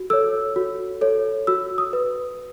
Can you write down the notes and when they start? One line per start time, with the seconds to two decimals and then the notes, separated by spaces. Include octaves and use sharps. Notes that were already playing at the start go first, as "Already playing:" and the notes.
Already playing: F#4
0.10 A4 C#5 E6
0.56 F#4
1.01 A4 C#5
1.47 F#4 E6
1.78 D#6
1.93 B4